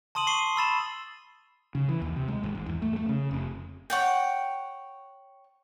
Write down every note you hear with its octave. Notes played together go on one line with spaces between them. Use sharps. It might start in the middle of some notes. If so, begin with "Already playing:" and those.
A5 C6 D#6 D#7 F#7
C#6 C7 D#7 G7
B5 E6 A6 E7
C#3
E3
D#2
C3
G#3
G#1
G#2
E2
A3
A3
C#3
F1
C#5 F#5 G5